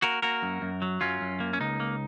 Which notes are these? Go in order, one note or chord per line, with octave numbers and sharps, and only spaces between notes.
A#3 F#4 A#4
A#3 F#4 A#4
F#2
F#2
F#3
F#2 C#4 F4
F#2
A#3
C#4
C#2 D#4
A#3